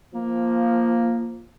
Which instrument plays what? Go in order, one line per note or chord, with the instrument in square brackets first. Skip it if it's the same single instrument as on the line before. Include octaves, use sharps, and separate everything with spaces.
[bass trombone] F3 [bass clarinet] A#3